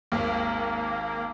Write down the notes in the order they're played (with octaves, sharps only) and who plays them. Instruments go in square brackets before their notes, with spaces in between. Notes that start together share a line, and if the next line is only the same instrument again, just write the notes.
[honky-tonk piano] G#1 D#2 [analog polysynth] A#3